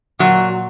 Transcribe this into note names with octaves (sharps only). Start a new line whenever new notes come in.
A#2 F#3